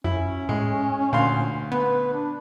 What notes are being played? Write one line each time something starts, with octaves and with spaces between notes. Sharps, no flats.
F#2 C#4 E4
A2 G#3
D2 A#2 F5 C6
B3 B4
D4